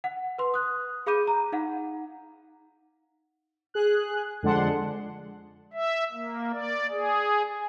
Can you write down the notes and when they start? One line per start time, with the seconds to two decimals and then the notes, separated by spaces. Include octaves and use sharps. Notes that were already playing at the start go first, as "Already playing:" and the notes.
0.04 F#5
0.38 B4 C6
0.54 D#6 F#6
1.06 G#4 F5 B5 D6 G6 D#7
1.27 A#5
1.52 D#4 F5 F#5
3.74 G#4 F#6
4.43 F2 D3 G#3 D4 F#5 C6
5.73 E5
6.12 A#3
6.52 D5
6.91 G#4